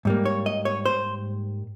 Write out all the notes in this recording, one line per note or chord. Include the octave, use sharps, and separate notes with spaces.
G#2 G3 A#3
C#5
D#5
C#5
C5